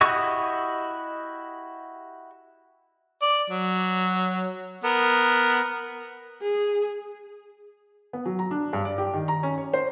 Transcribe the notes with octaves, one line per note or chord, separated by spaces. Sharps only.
E4 F#4 G4 D#5 C#6
D5
F#3
B3 A#4
G#4
B3
F#3
A#5
D4
G2
D5
G4
D#3
A#5
C#4
C#5
C5